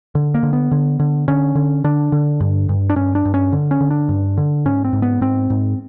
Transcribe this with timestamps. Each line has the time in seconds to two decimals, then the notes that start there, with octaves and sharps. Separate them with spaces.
0.15 D3
0.34 A#3
0.43 D3
0.53 B3
0.71 D3
0.99 D3
1.28 D3 C#4
1.55 D3
1.84 D3 D4
2.12 D3
2.40 G2
2.69 G2
2.90 D4
2.96 G2 C#4
3.15 D4
3.25 G2
3.34 C#4
3.52 D3
3.71 C#4
3.81 D3
3.91 D4
4.09 G2
4.37 D3
4.65 G#2 C#4
4.84 C4
4.93 G#2
5.02 B3
5.21 G#2 C4
5.50 G#2